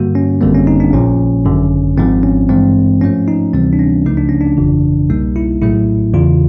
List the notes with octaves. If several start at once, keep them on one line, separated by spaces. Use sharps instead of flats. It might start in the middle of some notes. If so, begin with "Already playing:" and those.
Already playing: G2 D3 G3 A#3 F#4
C#4
G#1 F#2 D3 G3 A#3 C4
C#4
D#4
D4
A#1 A#2 F3 C#4
G#1 F#2 D3
G#1 G#2 F3 C4
C#4
G2 E3 G#3 C4
G#2 F3 A3 C#4
D#4
D2 C3 E3 G3 C4
D4
C#4
C#2 C#3 F3 A3 D#4
D4
C#4
D4
G1 F2 C#3 E3
C2 B2 G3 A#3 D#4
E4
A#1 A2 F#3 A3 E4
E2 C#3 E3 F4